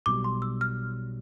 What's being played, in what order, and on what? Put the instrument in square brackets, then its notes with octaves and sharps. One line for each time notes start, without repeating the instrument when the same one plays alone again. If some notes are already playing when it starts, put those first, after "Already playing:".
[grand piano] B1 B2 G3 [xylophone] D6
[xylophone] C6
E6
F6